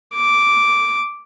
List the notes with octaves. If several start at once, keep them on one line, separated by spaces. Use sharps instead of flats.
D6